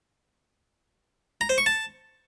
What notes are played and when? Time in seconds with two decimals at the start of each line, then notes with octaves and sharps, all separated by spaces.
1.41 A#5
1.49 C5
1.58 C#6
1.66 A5